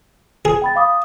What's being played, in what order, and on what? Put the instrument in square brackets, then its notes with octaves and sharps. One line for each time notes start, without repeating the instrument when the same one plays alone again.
[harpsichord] G#4
[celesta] G5 B5 A6
F5 D6 D#6